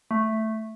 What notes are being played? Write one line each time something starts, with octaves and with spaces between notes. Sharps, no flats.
A3